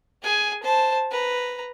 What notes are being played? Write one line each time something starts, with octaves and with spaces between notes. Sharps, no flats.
G#4 G#5
C5 A5
B4 A#5